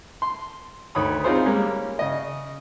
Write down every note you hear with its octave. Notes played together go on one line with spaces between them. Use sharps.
C6
D2 D#3 C#5 B5 D#6
C4 D#4 F4 G#4 C5 C#5
G3 G#3 A#3 C#4
C#3 D#5